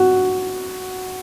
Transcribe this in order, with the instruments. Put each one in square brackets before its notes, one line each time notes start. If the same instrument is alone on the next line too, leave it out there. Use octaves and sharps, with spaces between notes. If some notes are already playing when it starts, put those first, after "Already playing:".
Already playing: [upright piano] F#4